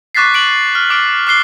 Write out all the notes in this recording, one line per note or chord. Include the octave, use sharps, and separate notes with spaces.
C#6 D6 F#6 A6 B6 C7
D7 F#7
F6
D6 F6 D7
D6 F#6 C7 G7